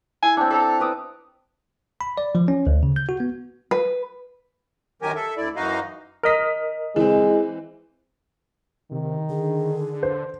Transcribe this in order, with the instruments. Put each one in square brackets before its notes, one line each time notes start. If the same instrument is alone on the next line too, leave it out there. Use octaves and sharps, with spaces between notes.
[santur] E4 [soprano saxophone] G#5
[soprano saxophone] A3 [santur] C4 D4
[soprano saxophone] A4 [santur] E5 A#5
[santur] B4 D6 D#6
[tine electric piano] B5
D5
F3
C#4
D2
C#3
G6
F#4
B3
[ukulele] B4
[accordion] F#2 D#3 F#3 G4 A#4 G#5
A4 E5
D2 E4 D5
F#2 E3 D#4 F#4 D#5 F5
[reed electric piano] A#4 D#5 D#6 [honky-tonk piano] F6 B6
[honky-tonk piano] E3 C4 [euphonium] G#3
[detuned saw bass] C3 [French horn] D#3
[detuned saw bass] D3 [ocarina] G#4
[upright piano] C5